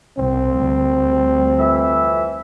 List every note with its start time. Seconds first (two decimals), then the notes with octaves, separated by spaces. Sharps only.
0.17 C2 C4
0.57 D2 G3
1.59 F2 E3 E5